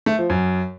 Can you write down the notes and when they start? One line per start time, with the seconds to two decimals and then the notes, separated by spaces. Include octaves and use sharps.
0.06 A3
0.18 F3
0.30 F#2